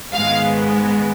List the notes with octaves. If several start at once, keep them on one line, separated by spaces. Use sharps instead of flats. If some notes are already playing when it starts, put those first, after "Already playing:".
G#2 D#3 G#3 B3 F5